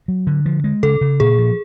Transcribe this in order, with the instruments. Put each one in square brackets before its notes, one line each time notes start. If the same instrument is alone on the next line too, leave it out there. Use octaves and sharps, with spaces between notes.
[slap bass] F#3
D3
F3
G#3
[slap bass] C#3 [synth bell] A4
[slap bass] C#3
[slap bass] A#2 [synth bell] G#4
[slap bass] F3